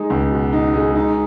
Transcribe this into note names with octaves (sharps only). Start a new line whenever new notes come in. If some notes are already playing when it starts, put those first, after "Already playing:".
Already playing: G#3 D#4
C#2
B2
D#4
G#3
D#4